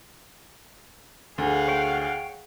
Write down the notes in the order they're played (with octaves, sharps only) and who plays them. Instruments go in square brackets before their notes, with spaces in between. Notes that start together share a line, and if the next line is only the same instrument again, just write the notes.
[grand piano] D2 [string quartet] G#4 F5 F#5
[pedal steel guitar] C#5 G5